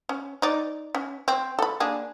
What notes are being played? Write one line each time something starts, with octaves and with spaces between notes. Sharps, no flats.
C#4
D#4 D5
C#4
C4
A4 B5
A#3 D4 G#4